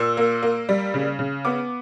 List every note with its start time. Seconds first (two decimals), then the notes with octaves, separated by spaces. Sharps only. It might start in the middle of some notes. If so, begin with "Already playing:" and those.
Already playing: A#2 E6
0.17 A#3
0.43 A#3
0.69 G3
0.94 C#3
1.19 C#3
1.45 B3 D6